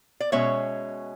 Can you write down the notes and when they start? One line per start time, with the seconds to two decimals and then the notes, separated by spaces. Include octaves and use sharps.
0.20 D5
0.32 B2 G#3 C#4 C#5 E5